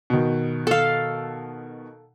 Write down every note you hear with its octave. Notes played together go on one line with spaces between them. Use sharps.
B2 D#3
A4 F5